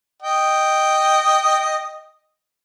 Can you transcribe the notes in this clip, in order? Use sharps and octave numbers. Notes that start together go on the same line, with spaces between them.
D#5 G5